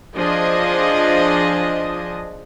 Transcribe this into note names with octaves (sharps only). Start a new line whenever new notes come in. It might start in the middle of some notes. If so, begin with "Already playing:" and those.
F3 D4 G#4 D#5